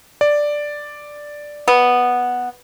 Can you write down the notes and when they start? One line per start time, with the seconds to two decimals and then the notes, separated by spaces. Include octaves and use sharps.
0.21 D5
1.68 B3